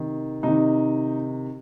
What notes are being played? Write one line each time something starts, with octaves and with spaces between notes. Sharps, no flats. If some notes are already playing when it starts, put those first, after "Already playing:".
Already playing: C3 D#3
C3 D#3 D#4